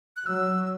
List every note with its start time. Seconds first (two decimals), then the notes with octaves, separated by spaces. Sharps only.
0.17 F#6
0.26 F#3 E6